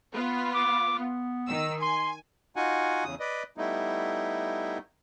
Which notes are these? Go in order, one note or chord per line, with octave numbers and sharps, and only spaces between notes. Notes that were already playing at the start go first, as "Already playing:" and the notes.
B3 F4
D6
B3
D#3 E6
G#5 C6
D#4 F4 F#4 F#5 G#5
E2 C#3 D#6
B4 D5 D#5
G3 A3 B3 D#4 E4